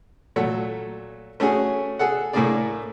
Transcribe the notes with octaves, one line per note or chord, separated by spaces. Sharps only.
A#2 F#3 A3 A4
A3 C#4 F#4 G#4
G#4 A4 F#5
A2 A3 A#3 D4 G#4 D5